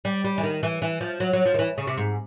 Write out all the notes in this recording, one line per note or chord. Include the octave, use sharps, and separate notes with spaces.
G3
G3
E3
D#3
E3
E3
F3
F#3
F#3
F3
D#3
E3
C#3
C3
G#2